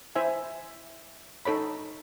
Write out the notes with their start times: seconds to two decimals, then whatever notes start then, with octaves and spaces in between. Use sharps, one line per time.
0.15 E4 C5 E5 G#5
1.45 D#4 A4 C#5 B5